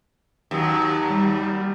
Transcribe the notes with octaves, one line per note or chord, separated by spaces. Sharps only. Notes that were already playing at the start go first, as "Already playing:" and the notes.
D#2 F#3
G3